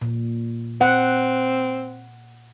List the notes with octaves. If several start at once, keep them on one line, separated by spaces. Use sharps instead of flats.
A#2
C4 F#5